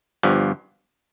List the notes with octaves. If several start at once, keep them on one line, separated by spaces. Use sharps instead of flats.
G1 G2 F3